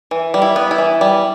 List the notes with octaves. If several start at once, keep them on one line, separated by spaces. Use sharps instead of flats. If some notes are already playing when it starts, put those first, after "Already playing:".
E3
G3
E4
B3
E4
E3
G3